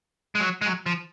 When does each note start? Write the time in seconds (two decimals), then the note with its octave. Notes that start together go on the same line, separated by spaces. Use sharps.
0.35 G#3
0.40 F#3
0.62 G#3
0.66 F#3
0.86 F3